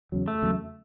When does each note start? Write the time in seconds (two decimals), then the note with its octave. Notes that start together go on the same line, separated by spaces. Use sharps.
0.12 E2 C#3 F#3
0.28 A3
0.42 E2 C#3 F#3